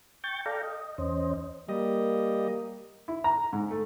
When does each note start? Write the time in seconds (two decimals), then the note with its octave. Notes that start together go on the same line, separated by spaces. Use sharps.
0.24 G5 C#6 G6 A6
0.46 A4 D5 F5 G5 A#5
0.63 D#5
0.98 E2 C#4 C5 D#5
1.69 G3 A#3 D#5
3.08 E4
3.24 A#5
3.53 G#2
3.71 A3